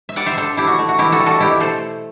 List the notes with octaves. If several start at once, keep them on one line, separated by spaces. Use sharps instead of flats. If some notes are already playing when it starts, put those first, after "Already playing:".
E5
G3 D5 F#5
C5 E5
D4 A4 C5
D4 E4 G4
F#4
A3
F#4
E3 E4 G4
F#4 A4
G3
F#4 A4
B2 E4 G4
A3 A4 C5